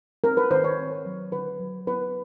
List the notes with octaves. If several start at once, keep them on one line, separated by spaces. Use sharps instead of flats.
C4 A#4
B4
D#3 C5
C#5
C4
F#3
D3 B4
F#3
B3 B4